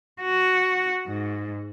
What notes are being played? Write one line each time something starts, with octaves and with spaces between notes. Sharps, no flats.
F#4
G#2